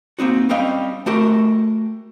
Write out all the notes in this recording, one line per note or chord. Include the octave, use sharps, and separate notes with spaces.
A#3 C4 D#4 F#4
G3 C4 C#4 D#5 F5 G5
A3 F#4 G4 A#4